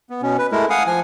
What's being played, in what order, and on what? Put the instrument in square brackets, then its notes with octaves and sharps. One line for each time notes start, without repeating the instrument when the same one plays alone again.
[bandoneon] B3
B2 C#4
B4
G#3 A3 E4 A#4
F5 F#5 G#5 D#6
F3 G#5